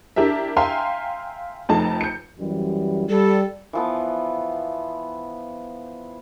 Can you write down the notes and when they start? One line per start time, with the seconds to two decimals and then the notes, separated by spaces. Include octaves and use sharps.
0.16 D4 E4 G4 A#4 E5
0.56 E5 F5 G5 G#5 A#5 C6
1.69 F1 F2 A3 D#4 A5
2.01 G6 C#7
2.39 F#2 E3 G3
3.09 G3 A4
3.73 E3 F3 B3